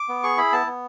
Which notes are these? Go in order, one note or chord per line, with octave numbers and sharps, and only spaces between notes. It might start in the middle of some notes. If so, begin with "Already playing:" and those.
Already playing: D6
B3
G#4 C#6
E4 B5
B3 A5
B3